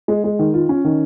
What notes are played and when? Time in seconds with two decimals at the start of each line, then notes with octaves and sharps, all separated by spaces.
0.08 G#3
0.24 G#3
0.39 D#3
0.54 F4
0.69 C#4
0.85 D#3